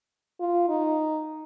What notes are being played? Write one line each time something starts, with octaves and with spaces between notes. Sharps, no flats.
F4
D#4